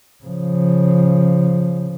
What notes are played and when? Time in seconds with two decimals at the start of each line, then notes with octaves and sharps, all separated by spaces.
0.24 C#3 F3